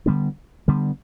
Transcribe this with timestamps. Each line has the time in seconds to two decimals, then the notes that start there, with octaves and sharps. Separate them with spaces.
0.06 D3 G3 B3 D4
0.68 D3 G3 B3